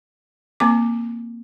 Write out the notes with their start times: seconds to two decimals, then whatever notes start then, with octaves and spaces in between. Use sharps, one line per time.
0.60 A#3 C4 D6